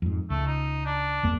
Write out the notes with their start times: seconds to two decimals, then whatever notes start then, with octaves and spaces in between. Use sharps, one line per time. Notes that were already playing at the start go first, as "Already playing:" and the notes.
0.02 F2 G#2
0.30 C#2 A3
0.47 D#4
0.85 D4
1.23 G1 E2 A#3